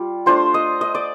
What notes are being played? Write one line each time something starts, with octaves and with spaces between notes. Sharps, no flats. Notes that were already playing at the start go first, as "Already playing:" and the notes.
Already playing: G3 F4
A3 D4 F4 C5
D#5
D#5
D5